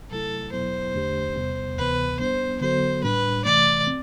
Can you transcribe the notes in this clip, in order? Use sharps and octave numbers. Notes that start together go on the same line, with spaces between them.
C3 F#3 A3 E4 A4
E2 B2 F#3 B3 E4 C5
E2 D3 A3 D4 G4
E2 C3 G3 B3
D2 C3 E3 B3 B4
G3 B3 D4 C5
D3 F#3 B3 F#4 A4 C5
A2 G3 D4 B4
C3 E3 A3 D5
C4